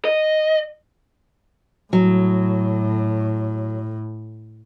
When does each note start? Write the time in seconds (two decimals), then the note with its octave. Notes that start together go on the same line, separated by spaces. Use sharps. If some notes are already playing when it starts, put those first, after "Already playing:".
0.05 D#5
1.93 A2 F#3